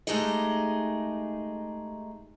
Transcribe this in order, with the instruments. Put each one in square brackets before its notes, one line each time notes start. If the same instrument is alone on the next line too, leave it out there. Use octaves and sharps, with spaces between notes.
[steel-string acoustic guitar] G#3 A3 D#4 G4 G#4 D#5